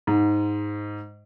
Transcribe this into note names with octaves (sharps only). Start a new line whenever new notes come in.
G#2